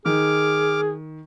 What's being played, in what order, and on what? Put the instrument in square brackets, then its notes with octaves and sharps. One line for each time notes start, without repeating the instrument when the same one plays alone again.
[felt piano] D#3 [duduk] G#4 [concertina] D6 F6